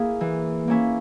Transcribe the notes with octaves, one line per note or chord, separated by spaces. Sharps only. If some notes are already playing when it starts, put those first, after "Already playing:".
Already playing: A#3 E4 G#4
E3
A#3 C#4 E4